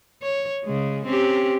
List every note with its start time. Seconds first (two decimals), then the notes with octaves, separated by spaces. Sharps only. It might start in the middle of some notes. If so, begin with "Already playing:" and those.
0.22 C#5
0.65 C#3 G#3
1.06 C4 C#4 G4